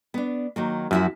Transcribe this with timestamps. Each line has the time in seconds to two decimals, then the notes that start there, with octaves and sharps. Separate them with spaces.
0.14 B3 D4
0.56 D#3 F#3 A#3
0.91 F#2 F3 E4 F#4